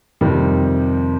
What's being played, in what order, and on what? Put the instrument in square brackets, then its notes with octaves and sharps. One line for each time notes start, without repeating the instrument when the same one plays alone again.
[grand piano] F2 C3 D#3 G3